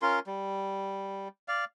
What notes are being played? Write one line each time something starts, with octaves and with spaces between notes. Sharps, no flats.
C#4 F4 A#4 C6
G3
D5 F5